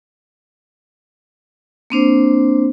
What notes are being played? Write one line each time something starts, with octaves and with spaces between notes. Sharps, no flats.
A#3 C4 D4 C5